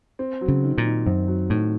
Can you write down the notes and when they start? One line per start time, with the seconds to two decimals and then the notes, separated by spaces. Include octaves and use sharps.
0.19 C4
0.41 F#3
0.48 C#3
0.63 D#3
0.78 A#2
0.84 D#3
1.06 F#2 C4
1.28 F#3
1.50 A2 D#3